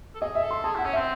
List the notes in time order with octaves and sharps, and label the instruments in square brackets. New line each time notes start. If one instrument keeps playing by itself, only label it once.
[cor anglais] A4
[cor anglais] G#4 [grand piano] D#5
[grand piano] E5
[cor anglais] A4
[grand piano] C6
[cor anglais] G#4 [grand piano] A5
[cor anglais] E4 [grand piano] F#5
[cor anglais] C#4
[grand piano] E5
[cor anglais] C4